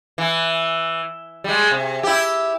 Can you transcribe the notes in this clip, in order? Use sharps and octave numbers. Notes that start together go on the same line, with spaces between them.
E3
G3 G#3
C3
E4 G4